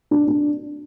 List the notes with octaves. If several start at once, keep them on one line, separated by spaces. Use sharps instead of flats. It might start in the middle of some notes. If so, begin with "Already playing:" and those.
D4
D4